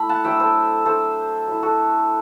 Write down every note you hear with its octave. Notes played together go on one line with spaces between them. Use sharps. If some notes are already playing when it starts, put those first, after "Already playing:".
Already playing: A3 E4 B5
F#5 A5
F#3 A3 D4 E5 G5
A4 C5
A3 D4 A4 C5
F#3 A3 E4
F#4 A4